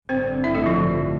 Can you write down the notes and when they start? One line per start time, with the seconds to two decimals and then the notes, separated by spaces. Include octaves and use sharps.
0.08 A1 G2 D3 C4 C5
0.44 E4 E5
0.55 A3 A4
0.66 F3 F4